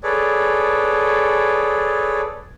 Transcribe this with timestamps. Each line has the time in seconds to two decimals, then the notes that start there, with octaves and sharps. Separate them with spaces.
0.03 G#4 A4 B4 C#5 D5